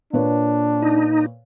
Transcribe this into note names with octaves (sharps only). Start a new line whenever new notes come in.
A#2 D4 B4 C#5
D#4